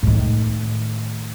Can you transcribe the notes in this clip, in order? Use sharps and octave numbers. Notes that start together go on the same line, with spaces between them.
A2 D#3